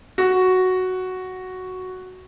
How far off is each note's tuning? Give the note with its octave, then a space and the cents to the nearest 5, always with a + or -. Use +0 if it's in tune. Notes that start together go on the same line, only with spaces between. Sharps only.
F#4 +0